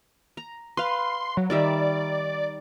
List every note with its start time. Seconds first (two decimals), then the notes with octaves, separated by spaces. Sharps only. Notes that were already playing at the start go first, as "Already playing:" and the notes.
0.37 A#5
0.77 B4 F5 C6
1.37 F#3
1.50 D#3 G3 D5 E5